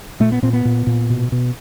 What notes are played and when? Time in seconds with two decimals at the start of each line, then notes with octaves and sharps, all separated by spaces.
0.20 A#2 A3
0.32 B3
0.42 A#2 C4
0.53 B3
0.65 A#2
0.87 A#2
1.10 B2
1.32 B2